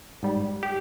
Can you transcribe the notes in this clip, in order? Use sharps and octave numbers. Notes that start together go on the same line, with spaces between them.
G#2 G3
G4